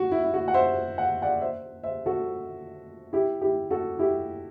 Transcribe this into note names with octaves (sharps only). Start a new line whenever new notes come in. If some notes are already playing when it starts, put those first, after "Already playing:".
Already playing: F#4
E4
E4
F#4
F#5
C5 E5
F#5
D5 F#5
C5 E5
C5 E5
F#4 A4
E4 G4
E4 G4
F#4 A4
E4 G4